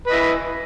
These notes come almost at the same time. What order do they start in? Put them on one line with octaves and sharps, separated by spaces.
B4 D#5 E4